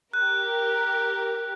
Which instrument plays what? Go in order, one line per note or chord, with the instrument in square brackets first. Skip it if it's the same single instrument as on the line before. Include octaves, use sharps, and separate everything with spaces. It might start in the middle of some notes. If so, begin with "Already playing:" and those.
[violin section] G4 A#4 [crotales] F#6